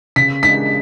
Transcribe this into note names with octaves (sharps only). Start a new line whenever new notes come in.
C#3 B6
G#3 D4 G#4 B6